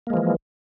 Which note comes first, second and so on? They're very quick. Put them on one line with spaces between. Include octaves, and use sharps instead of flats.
A#3 G#3 F3 E3